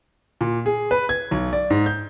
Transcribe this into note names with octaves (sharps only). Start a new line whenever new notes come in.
A#2
G#4
B4
G#6
B1
D5
G#2
G6